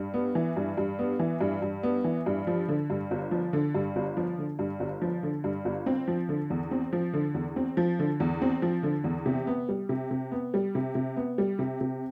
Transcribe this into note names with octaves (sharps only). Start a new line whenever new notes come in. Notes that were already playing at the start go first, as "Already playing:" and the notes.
Already playing: G2
B3
E3
G2
G2
B3
E3
G2
G2
B3
E3
G2
F3
D3
G2
G1
F3
D3
G2
G1
F3
D3
G2
G1
F3
D3
G2
G1
C4
F3
D3
E2
C4
F3
D3
E2
C4
F3
D3
E2
C4
F3
D3
E2
C3
B3
G3
C3
C3
B3
G3
C3
C3
B3
G3
C3
C3